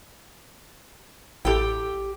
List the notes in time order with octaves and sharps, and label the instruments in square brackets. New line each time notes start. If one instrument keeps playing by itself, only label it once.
[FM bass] A1 [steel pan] E4 A4 [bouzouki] G4 G5